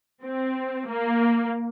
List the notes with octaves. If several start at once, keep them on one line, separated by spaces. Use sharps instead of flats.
C4
A#3